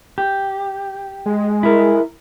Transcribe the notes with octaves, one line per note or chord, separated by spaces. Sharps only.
G4
G#3
E4 A#4